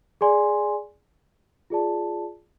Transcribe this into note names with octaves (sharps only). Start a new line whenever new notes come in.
G#4 D5 G#5 C6
F4 G#4 D5 A5